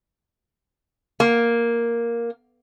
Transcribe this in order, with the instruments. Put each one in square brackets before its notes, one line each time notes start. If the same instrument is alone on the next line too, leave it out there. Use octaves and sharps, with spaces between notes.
[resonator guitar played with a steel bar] A#3